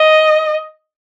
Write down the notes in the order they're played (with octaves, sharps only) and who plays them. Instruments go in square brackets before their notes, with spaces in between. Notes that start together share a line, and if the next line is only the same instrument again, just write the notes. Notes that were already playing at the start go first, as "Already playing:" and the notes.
Already playing: [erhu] D#5